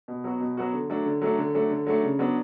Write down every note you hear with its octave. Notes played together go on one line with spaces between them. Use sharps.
B2
F#3 B3 F#4
B2
F#3 B3 F#4
D3
F#3 A3 D4
D3
F#3 A3 D4
D3
F#3 A3 D4
D3
F#3 A3 D4
C#3
F#3 B3 D4